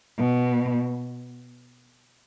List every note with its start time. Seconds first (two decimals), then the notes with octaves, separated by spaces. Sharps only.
0.18 B2